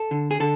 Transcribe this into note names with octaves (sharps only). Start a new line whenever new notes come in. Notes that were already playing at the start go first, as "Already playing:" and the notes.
Already playing: A4
D3
G#4
D3 A4